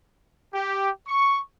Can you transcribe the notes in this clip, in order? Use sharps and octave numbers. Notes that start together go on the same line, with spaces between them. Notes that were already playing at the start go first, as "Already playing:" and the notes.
G4
C#6